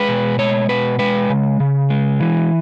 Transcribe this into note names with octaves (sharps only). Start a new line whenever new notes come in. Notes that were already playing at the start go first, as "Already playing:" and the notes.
Already playing: G#3 B4
B2
G#3 C#5
B2 B4
G#3 B4
C#3
C#3
G#3
E3